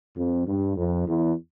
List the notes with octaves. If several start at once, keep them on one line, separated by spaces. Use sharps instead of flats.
F2
G2
F2
E2